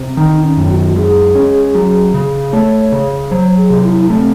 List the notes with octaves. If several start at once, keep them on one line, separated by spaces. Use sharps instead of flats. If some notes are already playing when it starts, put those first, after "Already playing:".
Already playing: C3
D#3 D#4
C#4
F#2
F#4
G#3 G#4
C#4
F#3
C#3
A3 C#5
C#3
F#3 C5
G#4
C3
E4
A3 C4